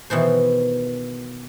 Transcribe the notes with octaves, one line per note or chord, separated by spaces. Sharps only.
B2 D#3 E3 C5